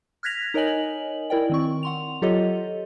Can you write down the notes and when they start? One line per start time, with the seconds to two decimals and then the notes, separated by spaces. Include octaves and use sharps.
0.23 F6 F#6 G#6 A#6 B6 F7
0.54 D#4 A#4 C#5 D#5 G#5 F#7
1.30 E4 A#4 D5 G5
1.50 D#3 C4 C#6
1.83 F#5 C6 F7
2.22 F#3 F4 G4 A4 C#5 D#5